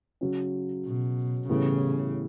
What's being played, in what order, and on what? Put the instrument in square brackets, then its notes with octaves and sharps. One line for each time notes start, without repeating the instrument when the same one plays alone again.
[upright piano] C#3 F#3 C#4
[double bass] B2
[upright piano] A2 E3 G3 B3 [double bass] C#3